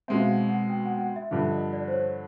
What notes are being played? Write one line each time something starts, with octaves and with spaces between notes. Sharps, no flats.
B2 G#3 C4 E5
F5
F#5
F#5
G5
F#5
G5
F#5
E5
G2 D3 F3 E5
D#5
D5
C5
C#5